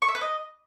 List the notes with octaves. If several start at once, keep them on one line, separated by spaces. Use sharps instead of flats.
C#6
E5
B4
D#5